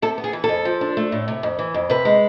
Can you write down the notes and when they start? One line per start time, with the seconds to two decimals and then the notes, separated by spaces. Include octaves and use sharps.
0.02 C3 A4
0.18 B3
0.24 G#4
0.33 E3
0.44 A4
0.49 F2
0.65 F3
0.81 D4
0.97 A3
1.12 A2
1.28 C3
1.43 F2
1.59 E3
1.74 F2
1.90 C3 B4
2.05 G#3